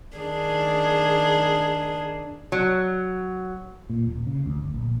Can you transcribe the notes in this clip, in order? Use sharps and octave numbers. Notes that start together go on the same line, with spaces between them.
D#3 D4 G#4
F#3
A#2
D#1
C#3
D2
G1
A#1